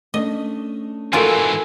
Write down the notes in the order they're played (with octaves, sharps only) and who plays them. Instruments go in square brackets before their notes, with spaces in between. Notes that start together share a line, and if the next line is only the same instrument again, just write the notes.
[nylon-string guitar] A3 C#4 D4 [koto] D#5
[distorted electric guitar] G#2 E3 [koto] F4 F#4 A#4 [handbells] A4 G#5